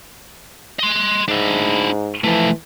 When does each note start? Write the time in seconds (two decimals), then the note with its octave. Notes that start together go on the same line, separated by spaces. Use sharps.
0.79 D#5 C6
1.29 G#2 D4 E4
2.24 E3 F3 A3